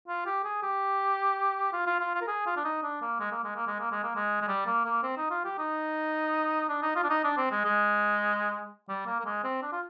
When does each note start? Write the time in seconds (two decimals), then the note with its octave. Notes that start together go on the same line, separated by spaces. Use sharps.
0.08 F4
0.26 G4
0.44 G#4
0.63 G4
1.73 F4
1.86 F4
2.00 F4
2.14 F4
2.22 A#4
2.28 G#4
2.46 F4
2.57 D4
2.65 D#4
2.83 D4
3.02 A#3
3.20 G#3
3.32 A#3
3.44 G#3
3.56 A#3
3.67 G#3
3.80 A#3
3.92 G#3
4.03 A#3
4.15 G#3
4.42 G#3
4.48 G3
4.67 A#3
4.85 A#3
5.03 C4
5.17 D#4
5.30 F4
5.44 G4
5.58 D#4
6.69 D4
6.82 D#4
6.96 F4
7.04 D4
7.10 D#4
7.24 D4
7.38 C4
7.51 G#3
7.65 G#3
8.88 G3
9.07 A#3
9.20 A#3
9.25 G#3
9.44 C4
9.62 D4
9.72 F4